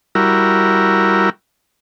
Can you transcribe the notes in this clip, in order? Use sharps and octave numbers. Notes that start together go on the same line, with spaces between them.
G3 E4 F#4 A#4